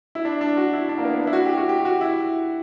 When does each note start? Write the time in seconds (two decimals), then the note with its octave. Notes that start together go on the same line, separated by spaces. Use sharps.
0.15 E4
0.25 D4
0.41 D4
0.57 F#4
0.73 E4
0.89 D4
0.98 A#3
1.05 B3
1.21 D4
1.27 E4
1.33 F#4
1.45 G4
1.57 F#4
1.69 G4
1.85 F#4
2.01 E4